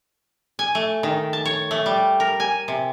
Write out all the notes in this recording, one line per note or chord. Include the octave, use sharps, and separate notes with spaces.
G#5
A3
D#3
A5
C#5
A3
G3
A#4
G#5
C3